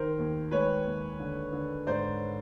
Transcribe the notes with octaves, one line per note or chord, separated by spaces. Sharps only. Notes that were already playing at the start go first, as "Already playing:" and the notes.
Already playing: D#3 A#4 C5
D#2
G#3 B4 C#5
D#2
D3
D3
G#2 C5 D5